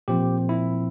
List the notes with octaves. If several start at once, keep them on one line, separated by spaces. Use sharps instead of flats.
A#2 F3 C4 G4
E4